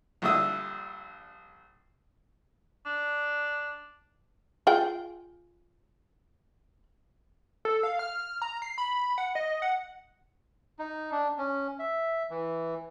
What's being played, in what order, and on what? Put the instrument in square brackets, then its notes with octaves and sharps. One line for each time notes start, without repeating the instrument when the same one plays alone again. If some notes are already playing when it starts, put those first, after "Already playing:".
[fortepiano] A#1 G2 D3 E5 D#6
[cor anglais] D4
[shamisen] F4 G#4 G5
[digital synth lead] A4
F5
F6
A#5
C7
B5
F#5
D#5
F#5
[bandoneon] D#4
D4
C#4
E5
E3